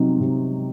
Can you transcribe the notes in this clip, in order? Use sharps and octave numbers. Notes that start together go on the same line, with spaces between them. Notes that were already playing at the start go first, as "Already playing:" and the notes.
Already playing: C3 F#3 C4 D#4
C3